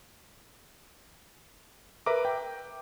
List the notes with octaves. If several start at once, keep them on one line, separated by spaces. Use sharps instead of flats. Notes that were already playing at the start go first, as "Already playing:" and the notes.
A#4 B4 E5 A#5 D6
G5